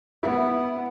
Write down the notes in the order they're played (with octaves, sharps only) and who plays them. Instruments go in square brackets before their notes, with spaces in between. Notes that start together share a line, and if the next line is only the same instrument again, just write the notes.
[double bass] B3 [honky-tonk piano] E4